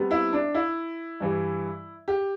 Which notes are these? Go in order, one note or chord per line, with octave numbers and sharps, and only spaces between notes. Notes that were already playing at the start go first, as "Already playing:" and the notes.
Already playing: C3 G3 B3
E4
D4
E4
G2 E3 G3
G4